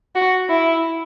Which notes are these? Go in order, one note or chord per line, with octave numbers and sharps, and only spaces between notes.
F#4
E4